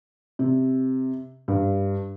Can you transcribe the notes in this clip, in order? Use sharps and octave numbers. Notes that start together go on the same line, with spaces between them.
C3
G2